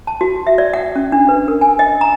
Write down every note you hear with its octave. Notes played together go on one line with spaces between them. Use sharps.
A5
F#4
E5
D5
F#5
C#4
D4
B4
A#4
G#5
D#5
A#5